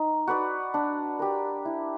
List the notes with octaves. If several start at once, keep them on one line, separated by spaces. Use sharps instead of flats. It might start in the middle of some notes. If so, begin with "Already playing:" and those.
Already playing: D#4
F#4 B4 D5
D4
G4 A#4
E4